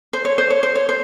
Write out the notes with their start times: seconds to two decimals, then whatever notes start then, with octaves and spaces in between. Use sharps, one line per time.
0.13 C5
0.25 C#5
0.38 C5
0.50 C#5
0.63 C5
0.75 C#5
0.89 C5